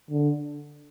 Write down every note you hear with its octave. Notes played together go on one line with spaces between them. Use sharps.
D3